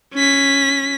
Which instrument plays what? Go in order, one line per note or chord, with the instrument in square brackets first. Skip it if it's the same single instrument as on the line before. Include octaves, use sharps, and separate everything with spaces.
[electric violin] C#4 B6